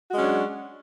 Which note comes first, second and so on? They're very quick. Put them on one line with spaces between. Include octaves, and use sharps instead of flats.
F#4 G#3 C#4 F#3 D4